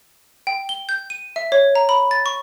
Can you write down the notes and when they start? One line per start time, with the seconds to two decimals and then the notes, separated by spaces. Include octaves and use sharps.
0.47 G5
0.69 G7
0.89 G6
1.10 D#7
1.36 E5
1.52 C#5
1.75 A#5
1.89 B5
2.11 A6
2.26 C#6